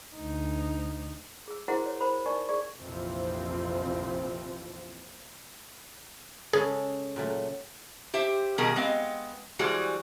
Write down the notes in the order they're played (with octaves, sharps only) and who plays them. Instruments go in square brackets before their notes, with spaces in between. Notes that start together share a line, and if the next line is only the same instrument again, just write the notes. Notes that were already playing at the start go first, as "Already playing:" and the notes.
[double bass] D2 D#4
[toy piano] G#4 E6
E4 F#4 G#4 A#4 C5 F#5
C#5
A#4 C5 B5
D#4 A#4 D5 G#5 C#6
G#4 D5 C#6
[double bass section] A#1 F2 C3 E3 F3 C4
[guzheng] C#3 G#3 A4 [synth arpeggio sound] G#4
[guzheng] A#2 F#3 A3
[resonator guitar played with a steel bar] G4 C5 E5
B2 D#3 F3 G3 G#4 A#4
G#3 B3 C4 D#5 F5
E3 G3 G#3 F#4 G#4 C5